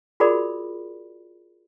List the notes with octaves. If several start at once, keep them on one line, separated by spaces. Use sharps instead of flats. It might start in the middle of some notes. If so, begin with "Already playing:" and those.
F4 F#4 G#4 A#4 D5 B5